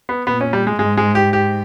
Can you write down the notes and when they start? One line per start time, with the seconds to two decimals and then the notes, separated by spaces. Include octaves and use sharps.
0.09 B3
0.27 A#2 B3
0.41 C#4
0.53 G3
0.67 G#3
0.79 G#2 G#3
0.97 G#3
1.15 G4
1.33 G4